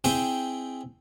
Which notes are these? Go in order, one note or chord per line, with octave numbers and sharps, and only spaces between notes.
C4 E4 G#4 G5